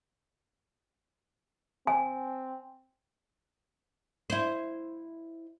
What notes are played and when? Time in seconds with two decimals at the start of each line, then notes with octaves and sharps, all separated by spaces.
1.87 C4 G#5
4.30 E4 C5